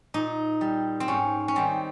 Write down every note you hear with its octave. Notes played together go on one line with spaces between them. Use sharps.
A#2 D#4
G3
C4
G#2 C#4
C#4
D#3 G3 C4